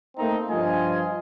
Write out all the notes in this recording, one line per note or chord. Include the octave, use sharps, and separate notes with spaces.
A3 A#3 C4 D#4
G2 F3 F4 D#5 G#5